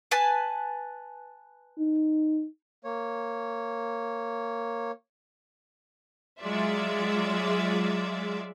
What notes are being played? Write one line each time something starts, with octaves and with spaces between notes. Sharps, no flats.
B4 G#5 A5
D#4
A#3 C#5
F#3 G#3 F4 D5 E5